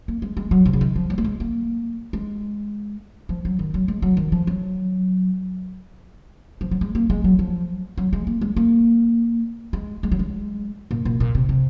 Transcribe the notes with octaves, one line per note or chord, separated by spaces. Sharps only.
A#3
G#3
G#3
F#3
C3
C#3
D#3
F3
F#3
A#3
G#3
A#3
G#3
F3
F#3
D#3
F#3
G#3
F#3
D#3
F3
F#3
F3
F#3
G#3
A#3
G#3
F#3
F3
F#3
G#3
A#3
G#3
A#3
G#3
G#3
F#3
G#3
A#2
A#2
A#2
C3
C3